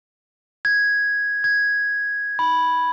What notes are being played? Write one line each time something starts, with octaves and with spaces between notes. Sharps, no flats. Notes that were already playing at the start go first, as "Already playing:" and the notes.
G#6
G#6
B5